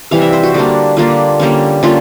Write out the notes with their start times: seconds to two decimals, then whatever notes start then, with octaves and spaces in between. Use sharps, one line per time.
0.11 C3 E3 G3 F5
0.22 E5
0.33 C5
0.43 F#4
0.54 D3 G3 A#3 D4
0.97 D3 G3 A#3 D4 F4
1.40 D3 G3 A#3 C#4
1.83 D3 G3 A#3 C#4 F4